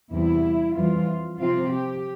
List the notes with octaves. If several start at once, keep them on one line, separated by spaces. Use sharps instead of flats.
E2 C3 G3 E4
F2 E3 G3 F4
C3 F3 C4 F4
G4